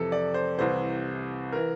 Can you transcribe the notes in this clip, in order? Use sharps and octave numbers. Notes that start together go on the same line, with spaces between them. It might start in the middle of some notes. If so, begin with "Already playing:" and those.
Already playing: F2 C3 E3 A4
D5
C5
C2 C3 E3 C5
E3 A#4